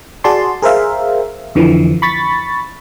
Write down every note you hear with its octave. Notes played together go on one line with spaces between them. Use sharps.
F#4 G#4 D5 A5 C6
G#4 A#4 C5 E5 F5
F2 D3 E3 F3
B5 C#6 A6 B6